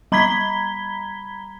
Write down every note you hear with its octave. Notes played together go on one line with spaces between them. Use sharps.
G3 A#5 B5 G#6 B6 G7